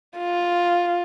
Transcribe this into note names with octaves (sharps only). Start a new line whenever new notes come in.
F4